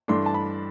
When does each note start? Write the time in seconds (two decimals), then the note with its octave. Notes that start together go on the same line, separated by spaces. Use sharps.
0.08 G2 E3 A3 D4 C6
0.26 A5
0.34 B5